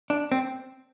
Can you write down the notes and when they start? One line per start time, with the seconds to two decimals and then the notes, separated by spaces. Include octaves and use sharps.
0.10 D4
0.32 C4